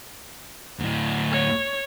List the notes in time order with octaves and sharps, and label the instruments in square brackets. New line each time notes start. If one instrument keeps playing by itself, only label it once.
[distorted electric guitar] D2 A2
[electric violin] C#5